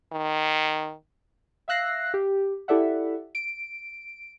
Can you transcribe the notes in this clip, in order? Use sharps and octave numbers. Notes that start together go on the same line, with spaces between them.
D#3
E5 F5 E6 F#6 A#6 C7
G4
E4 G4 A4 D5 E5 F#5
D7